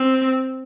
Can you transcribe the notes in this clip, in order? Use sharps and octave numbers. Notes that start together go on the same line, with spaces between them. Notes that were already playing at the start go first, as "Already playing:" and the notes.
Already playing: C4